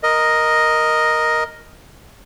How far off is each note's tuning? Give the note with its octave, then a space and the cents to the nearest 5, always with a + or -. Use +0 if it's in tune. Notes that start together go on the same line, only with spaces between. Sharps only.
A#4 +5 D#5 +0